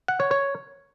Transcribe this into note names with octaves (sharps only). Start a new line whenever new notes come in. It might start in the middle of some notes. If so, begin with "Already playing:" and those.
F#5
C#5
C#5